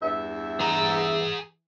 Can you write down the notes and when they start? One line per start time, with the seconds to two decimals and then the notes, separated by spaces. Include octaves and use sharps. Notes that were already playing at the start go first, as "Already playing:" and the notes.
0.02 E2 G2 E5
0.60 E3 G#4 A#5